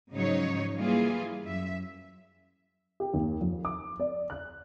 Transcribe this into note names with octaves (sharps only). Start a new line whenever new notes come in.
G#2 C#3 F3 F#3 D#4 C#5
E3 G3 A#3 F4 G#4
F#2 E5
G4
D#2
F2
D6
D5
F#6